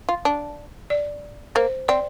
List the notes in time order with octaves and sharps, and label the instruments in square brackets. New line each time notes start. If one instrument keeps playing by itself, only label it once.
[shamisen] F4
D4
[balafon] D5
[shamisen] A#3 [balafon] C5
[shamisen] C4 [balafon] D5